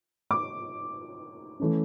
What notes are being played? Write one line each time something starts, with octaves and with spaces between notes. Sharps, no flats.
D6
E3 A3 C#4